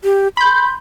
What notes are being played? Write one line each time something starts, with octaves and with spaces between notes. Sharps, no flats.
G4
B5 C6 G6